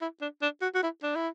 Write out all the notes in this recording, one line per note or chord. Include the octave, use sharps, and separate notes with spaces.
E4
D4
D4
F#4
F#4
E4
D4
E4